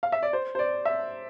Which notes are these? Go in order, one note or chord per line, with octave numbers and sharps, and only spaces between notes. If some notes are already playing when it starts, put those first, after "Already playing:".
F5
E5
D5
C5
C5
D5
E5